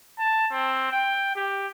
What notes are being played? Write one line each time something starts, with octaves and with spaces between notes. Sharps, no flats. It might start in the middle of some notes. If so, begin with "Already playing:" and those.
A5
C4
G5
G4